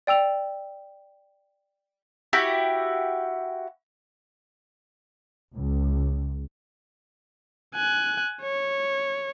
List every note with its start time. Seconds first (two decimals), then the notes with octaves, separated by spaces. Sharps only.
0.07 D5 G5 E6 F7
2.33 E4 F#4 G4
5.53 C#2
7.75 G#5 F#6
8.42 C#5